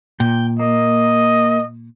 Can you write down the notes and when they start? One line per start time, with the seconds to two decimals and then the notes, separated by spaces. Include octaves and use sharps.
0.20 A#2 G5
0.59 A#3 D#5